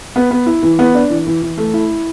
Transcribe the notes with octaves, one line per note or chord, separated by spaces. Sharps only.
B3
B3
E4
E3
B3
D4
E3
E3
E3
A3
E4